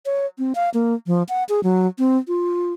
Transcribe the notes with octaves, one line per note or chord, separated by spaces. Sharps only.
C#5
C4
F5
A#3
F3
F#5
G#4
F#3
C4
F4